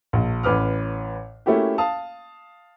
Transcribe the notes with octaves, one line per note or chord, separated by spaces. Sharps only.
A#1
A1 B4 D6 F6
A3 A#3 C#4 E4 F#4 G4
F5 A5 D#6